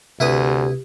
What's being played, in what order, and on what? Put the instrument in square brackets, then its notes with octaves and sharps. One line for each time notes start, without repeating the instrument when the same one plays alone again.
[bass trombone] D2 [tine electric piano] C3 [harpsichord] E4 B4 D#6 [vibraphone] G4